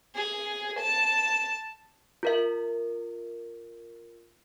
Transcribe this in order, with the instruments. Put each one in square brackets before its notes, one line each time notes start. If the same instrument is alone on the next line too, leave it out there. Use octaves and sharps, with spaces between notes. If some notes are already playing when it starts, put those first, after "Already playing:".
[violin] G#4
A5
[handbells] F4 A#4 E5